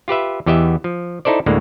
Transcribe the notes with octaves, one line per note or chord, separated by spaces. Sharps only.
F4 G4 B4 E5
E2 E3 G4 D#5 E5
F3
D#4 E4 A4 C5 D5
D2 A2 D3 G#3 A#3